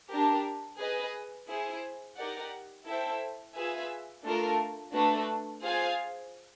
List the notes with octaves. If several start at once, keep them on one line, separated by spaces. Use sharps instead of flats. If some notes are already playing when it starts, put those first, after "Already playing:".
D4 G4 A#4
G#4 B4 D#5
E4 G#4 C5
D#4 G4 A#4 D5 F#5
E4 A4 C5 E5 G5
F4 G#4 B4 E5 G#5
A3 D4 F4 A#4
A3 D4 F#4 B4
F4 G#4 C5 F5 G#5